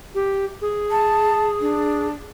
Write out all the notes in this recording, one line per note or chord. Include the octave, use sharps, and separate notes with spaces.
G4
G#4
A5
D4